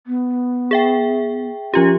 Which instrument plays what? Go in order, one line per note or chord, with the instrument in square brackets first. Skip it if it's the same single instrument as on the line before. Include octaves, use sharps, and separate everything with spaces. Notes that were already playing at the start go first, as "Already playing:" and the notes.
[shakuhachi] B3
[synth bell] G#4 E5 G5
[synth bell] F3 F4 G4 [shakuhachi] C#4